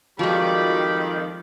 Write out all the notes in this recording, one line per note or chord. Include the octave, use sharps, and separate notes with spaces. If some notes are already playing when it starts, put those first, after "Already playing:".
F2 D#3 F3 G3 G#3 F#4 D5 B5